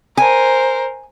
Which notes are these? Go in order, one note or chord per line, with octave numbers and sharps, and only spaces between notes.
A#4 C5 G#5